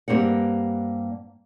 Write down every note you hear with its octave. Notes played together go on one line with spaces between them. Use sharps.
G2 G3 A3 A#3 C4 F#5